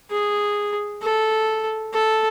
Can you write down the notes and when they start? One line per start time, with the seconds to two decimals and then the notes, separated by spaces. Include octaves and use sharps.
0.11 G#4
1.02 A4
1.93 A4